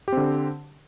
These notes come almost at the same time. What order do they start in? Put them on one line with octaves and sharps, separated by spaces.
G4 C4 D3